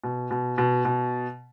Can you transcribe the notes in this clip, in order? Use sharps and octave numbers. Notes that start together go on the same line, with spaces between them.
B2
B2
B2
B2